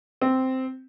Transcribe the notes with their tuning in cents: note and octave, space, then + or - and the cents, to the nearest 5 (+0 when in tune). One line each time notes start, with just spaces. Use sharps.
C4 -5